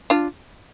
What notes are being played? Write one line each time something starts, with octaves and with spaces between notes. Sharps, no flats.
D4 F4